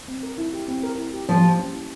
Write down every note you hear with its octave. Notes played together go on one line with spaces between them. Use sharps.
C4
A#4
E4
G4
C4
A#4
E4
G4
F3 A#3
G4
C#4
E4